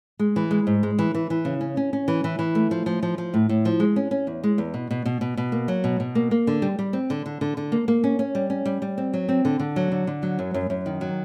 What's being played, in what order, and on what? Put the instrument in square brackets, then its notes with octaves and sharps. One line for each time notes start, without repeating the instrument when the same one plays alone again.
[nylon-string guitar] G#3
E3
G#3
G#2
G#3
E3
E3
E3
C#3
C#4
C#4
C#4
E3
E3
E3
A3
F3
F3
F3
F3
A2
A2
F3
G#3
C#4
C#4
E2
G#3
E2
B2
B2
B2
B2
B2
A#3
F#3
B2
B2
A#3
A#3
D3
G3
G3
C4
D3
D3
D3
D3
A#3
A#3
C#4
C#4
G3
C#4
G3
G3
C4
F#3
C4
D3
D3
F#3
D3
D3
F#3
F#2
F#2
F#2
D#3
F#3